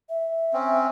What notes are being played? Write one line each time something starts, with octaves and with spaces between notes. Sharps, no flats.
E5
C4 C#4